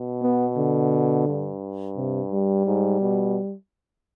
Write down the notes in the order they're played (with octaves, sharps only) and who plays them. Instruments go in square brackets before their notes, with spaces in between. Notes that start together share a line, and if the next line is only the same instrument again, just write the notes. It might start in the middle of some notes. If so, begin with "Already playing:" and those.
Already playing: [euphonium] B2
[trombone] B3
D3
[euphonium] G2
[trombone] C3
G3
[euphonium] G#2
B2